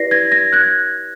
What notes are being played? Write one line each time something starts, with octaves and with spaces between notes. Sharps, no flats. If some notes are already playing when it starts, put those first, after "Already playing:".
Already playing: E4 G4 B4 D5 A#6 C7
G#6 A#6
G#6 A#6
F#6 G#6